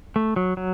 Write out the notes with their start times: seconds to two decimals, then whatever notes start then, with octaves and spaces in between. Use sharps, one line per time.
0.16 A3
0.36 F#3
0.57 F#3